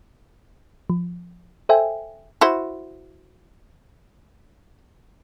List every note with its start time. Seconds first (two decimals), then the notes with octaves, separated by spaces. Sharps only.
0.90 F3
1.69 A4 C5 E5 G5 G#5
2.41 E4 F#4 C5